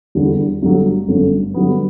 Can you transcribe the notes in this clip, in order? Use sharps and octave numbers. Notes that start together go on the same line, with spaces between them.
E2 D3 G3 B3
G1 G2 D3 F#3 A3
G1 F#2 D3 A3
G2 D3 F#3 B3